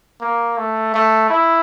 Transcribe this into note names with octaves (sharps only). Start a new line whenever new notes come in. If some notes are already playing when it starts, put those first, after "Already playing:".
A#3
A3
A3
E4